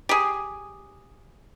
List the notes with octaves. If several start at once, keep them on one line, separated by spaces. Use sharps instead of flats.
G4 G#4